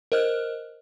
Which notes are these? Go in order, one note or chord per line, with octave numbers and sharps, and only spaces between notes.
A#4 C5 D#5 F6 F#6